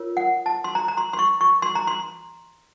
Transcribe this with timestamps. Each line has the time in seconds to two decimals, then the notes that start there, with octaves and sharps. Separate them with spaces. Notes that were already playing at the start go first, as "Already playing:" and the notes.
Already playing: F4 A#4 C#5
0.17 F#5
0.46 A5
0.64 C6
0.75 A#5
0.88 A#5
0.97 C6
1.13 C6
1.19 C#6
1.41 C#6
1.62 C6
1.75 A#5
1.87 C6